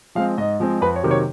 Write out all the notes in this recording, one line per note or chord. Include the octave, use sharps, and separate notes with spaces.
F3 G#3 C4 F5
G#2 D#5
F3 G#3 C4
F2 B4
C#5
C3 D#3 F#3 A#3
C#5